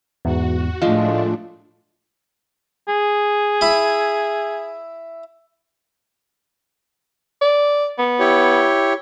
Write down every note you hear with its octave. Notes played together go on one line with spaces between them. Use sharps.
E2 G#2 F#4
A2 F3 G#3 A3 D4 D#5 F5
G#4
E4 B5
D5
B3
E4 G4 C#5